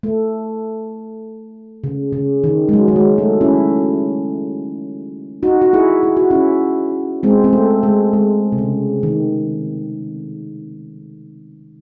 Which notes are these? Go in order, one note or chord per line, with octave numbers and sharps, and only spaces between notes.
A3
C#3
C#3
D#3
G#3
F#3
F#3
G#3
A3
C#4 E4
D#4 F#4
F#4
E4 G#4
E4
F#4
C#4 E4
G#3 C4
C4
A3
G#3
G#3
C3
C#3
D#3